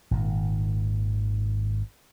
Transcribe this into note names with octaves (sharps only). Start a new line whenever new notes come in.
G#1 A#2 D#3